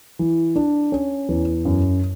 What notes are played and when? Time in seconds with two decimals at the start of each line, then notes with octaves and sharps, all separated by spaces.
0.19 E3
0.56 D4
0.92 C#4
1.29 E2
1.65 F#2